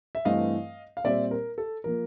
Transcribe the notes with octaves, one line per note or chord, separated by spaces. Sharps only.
E5
G2 E3 A3 C4 D#5 F5
F5
A#2 G3 C4 D5 E5
A#4
A4
F3 A#3 A#4